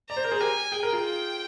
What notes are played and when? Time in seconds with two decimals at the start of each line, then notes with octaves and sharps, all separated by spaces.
0.09 D5 A#5
0.17 C5
0.25 A#4
0.31 G#4 C5
0.40 G4 A#4 G#5
0.72 G#4 G5
0.83 A#4
0.93 F4 G#4